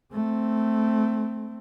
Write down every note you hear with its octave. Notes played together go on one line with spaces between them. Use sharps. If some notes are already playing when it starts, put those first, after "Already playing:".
A3 C4